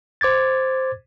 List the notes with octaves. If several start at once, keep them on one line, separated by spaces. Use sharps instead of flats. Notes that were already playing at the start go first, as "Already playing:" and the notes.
C5 D6 G#6 A6